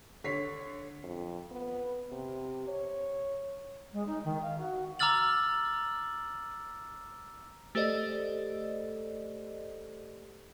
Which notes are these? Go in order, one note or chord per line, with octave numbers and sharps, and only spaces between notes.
D3 C#5 B6 C7
F2
B3
C3
C#5
G#3
D#4
D#3
F5
F#4
A#5 D6 E6 F6 A6 F#7
A3 G4 A4 C5 D5 D#5